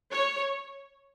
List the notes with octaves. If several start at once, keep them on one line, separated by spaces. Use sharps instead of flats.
C#5